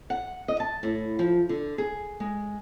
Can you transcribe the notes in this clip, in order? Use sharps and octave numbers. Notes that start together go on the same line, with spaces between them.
F#5
D#5
A5
A2
F3
D3
G#4
G#3